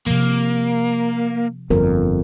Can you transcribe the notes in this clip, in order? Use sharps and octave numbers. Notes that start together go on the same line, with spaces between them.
C3 F3 A#3
G1 F2 A#4